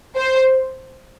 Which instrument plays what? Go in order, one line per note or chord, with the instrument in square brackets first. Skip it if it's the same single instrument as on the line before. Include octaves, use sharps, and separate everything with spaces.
[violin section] C5